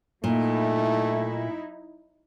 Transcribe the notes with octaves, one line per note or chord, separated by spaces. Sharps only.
A#2 F#3 A3 D#4 E4